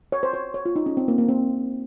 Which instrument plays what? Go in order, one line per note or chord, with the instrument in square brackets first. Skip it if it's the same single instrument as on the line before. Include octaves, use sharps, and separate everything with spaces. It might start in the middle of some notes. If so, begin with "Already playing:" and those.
[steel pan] C#5
C5
C#5
C#5
F4
D#4
C#4
C4
A#3
A#3
C4